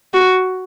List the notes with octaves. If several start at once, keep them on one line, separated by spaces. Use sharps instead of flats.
F#4